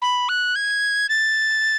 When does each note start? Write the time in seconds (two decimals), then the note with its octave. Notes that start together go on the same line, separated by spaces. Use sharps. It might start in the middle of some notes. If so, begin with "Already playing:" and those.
0.02 B5
0.29 F#6
0.56 G#6
1.09 A6